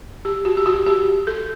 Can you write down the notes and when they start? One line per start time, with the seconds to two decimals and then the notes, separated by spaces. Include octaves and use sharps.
0.25 G4
0.45 F#4
0.57 G4
0.66 F#4
0.86 G4
1.27 A4